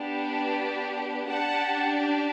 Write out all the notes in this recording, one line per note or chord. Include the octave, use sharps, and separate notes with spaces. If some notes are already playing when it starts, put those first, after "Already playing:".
Already playing: B3 D4 G4
D4 G4 F#5 A5